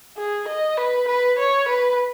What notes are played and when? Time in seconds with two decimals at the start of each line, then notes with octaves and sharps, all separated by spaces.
0.17 G#4
0.48 D#5
0.77 B4
1.08 B4
1.39 C#5
1.68 B4